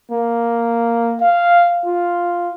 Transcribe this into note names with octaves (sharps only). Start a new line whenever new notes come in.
A#3
F5
F4